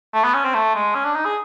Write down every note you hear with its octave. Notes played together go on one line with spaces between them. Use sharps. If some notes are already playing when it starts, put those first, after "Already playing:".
A3
B3
C#4
C4
A3
G#3
C#4
D4
D#4
G#4